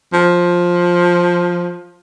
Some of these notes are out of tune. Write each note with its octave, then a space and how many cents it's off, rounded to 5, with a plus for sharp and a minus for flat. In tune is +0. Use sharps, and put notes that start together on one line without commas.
F3 +10